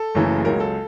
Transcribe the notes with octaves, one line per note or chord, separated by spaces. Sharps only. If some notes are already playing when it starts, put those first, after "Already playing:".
Already playing: A4
F#1 F#2 C#3 E3 A3
C#2 C#3 F#3 A#4
A4